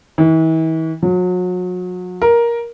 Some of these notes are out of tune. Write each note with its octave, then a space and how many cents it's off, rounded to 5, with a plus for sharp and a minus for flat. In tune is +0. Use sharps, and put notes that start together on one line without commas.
E3 -40
F#3 -35
A#4 +10